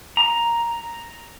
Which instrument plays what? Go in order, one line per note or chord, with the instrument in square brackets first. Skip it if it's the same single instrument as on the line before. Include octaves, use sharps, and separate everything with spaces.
[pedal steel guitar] A#5